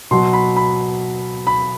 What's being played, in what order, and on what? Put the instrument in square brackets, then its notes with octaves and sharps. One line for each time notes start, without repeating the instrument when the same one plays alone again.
[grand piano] B2 F#3 C6
B5
B5
B5